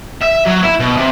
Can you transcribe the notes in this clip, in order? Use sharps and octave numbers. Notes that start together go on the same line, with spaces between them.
E5
F#3
E4
B2
C3